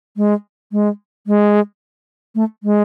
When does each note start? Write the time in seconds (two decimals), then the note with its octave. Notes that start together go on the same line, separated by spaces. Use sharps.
0.17 G#3
0.72 G#3
1.27 G#3
2.35 A3
2.63 G#3